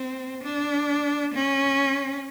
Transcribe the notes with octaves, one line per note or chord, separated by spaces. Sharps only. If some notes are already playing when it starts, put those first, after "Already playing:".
Already playing: C4
D4
C#4